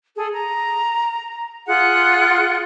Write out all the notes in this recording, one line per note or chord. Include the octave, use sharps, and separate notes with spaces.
G#4 A4
A#5
F4 G#4 F#5 F#6